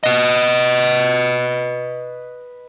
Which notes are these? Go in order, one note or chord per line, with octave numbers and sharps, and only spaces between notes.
B4 D#5